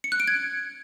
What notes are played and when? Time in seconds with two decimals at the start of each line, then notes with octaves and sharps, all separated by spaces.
0.04 C#7
0.12 F#6
0.20 D7
0.28 G#6